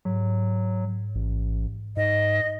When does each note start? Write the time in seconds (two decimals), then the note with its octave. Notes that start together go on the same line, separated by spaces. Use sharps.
0.05 G#2 F#3
1.15 A1
1.97 G#2 D#5